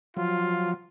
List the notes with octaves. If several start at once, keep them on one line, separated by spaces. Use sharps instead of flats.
F3 F#3 F4